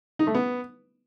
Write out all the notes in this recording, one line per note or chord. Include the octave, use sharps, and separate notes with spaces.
D#4
A3
B3